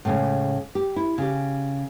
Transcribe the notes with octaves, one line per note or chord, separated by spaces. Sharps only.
A2 C#3 G#3
G4
E4
C#3 G4